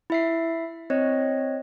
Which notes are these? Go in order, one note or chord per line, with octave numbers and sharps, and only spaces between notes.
E4 E5 C7
C4 C#5 D#5